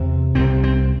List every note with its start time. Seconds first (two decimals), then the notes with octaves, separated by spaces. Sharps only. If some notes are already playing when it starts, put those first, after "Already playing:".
Already playing: E2 C3
0.35 C2 C3 C4
0.64 C4